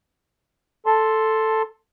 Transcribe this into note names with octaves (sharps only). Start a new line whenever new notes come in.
A4 A5 C6